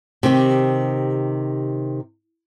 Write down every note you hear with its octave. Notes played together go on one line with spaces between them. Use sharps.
C3 D#3 G4